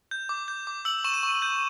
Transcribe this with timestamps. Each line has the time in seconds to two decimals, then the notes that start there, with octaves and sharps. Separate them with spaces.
0.11 G6
0.29 D6
0.48 G6
0.67 D6
0.85 E6 F#7
1.04 C#6 E7
1.14 D#7
1.23 C#6
1.42 G6